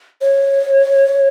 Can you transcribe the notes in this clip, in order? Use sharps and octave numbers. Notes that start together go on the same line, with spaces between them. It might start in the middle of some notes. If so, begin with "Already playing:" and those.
C#5